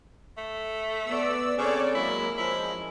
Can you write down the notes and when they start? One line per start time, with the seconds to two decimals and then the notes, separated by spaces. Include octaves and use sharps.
0.38 A3
1.06 B3 D5 E6
1.58 C#3 C4 C#4 A4 C#5 D5 C#6 D6
1.95 F#3 G#3 A#3 E4 A#4
2.37 F3 G#3 E4